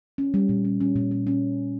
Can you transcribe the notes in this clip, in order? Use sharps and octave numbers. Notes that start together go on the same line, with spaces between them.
C#4
G3
A#2
C#4
C#4
A#2
C#4
C#4